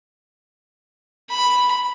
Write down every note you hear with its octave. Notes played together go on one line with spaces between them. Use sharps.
B5